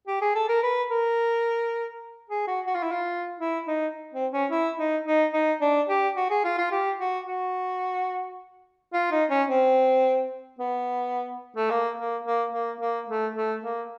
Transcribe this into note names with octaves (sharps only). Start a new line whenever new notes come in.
G4
G#4
A4
A#4
B4
A#4
G#4
F#4
F#4
F4
E4
F4
E4
D#4
C4
C#4
E4
D#4
D#4
D#4
D4
G4
F#4
G#4
F4
F4
G4
F#4
F#4
F4
D#4
C#4
C4
B3
A3
A#3
A#3
A#3
A#3
A#3
A3
A3
A#3